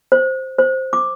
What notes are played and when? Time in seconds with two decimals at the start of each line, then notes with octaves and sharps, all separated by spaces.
0.12 C5
0.59 C5
0.93 D6